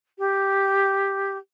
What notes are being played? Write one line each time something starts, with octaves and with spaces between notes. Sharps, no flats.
G4